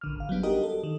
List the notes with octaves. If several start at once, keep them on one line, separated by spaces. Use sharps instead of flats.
A#1 D3 F6
G#1 F5
F#3 G3 B3 D4
D4 D#4 F#4 G4 A#4 D#5
A4
D#3